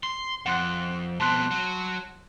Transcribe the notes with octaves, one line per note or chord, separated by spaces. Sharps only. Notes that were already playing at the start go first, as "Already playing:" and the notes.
C6
F2 F#5 C6 F#6
F2 B2 A5 C6 F#6
F#3